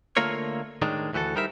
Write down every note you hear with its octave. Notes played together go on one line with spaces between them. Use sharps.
D3 A3 A#3 F4 A#4 C#5
A2 D#3 G#3 D4
D2 E3 F#4 G4 A4
G3 D#4 A#4 C5 E5